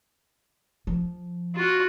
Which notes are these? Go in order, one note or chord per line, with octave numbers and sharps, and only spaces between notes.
F3
F4 F#4